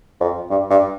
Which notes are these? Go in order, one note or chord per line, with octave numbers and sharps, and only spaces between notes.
F2
G2
G2